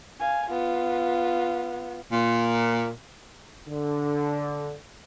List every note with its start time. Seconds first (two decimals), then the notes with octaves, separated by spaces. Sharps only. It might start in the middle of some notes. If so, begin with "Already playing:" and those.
0.20 F5 G#5
0.50 B3 F4
2.12 A#2
3.68 D3